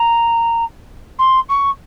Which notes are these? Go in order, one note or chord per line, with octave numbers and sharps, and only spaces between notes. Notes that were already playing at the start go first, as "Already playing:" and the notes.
Already playing: A#5
C6
C#6